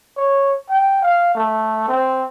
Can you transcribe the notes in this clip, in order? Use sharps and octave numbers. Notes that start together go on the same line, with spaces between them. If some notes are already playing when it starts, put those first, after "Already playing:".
C#5
G5
F5
A3
C4